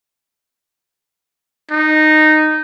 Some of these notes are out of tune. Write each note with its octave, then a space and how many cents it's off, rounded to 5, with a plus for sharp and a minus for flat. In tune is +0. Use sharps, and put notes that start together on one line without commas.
D#4 -10